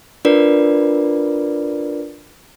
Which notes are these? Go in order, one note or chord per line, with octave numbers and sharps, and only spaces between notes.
D4 F4 A#4 B4 D5